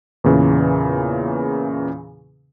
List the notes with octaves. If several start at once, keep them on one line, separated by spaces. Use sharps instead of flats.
E2 A#2 C#3 E3